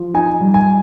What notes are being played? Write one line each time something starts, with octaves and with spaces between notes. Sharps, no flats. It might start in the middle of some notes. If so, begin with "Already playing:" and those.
Already playing: F3
D#4 G#5
G3
G#5